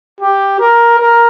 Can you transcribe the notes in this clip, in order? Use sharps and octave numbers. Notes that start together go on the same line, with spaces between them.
G4
A#4
A#4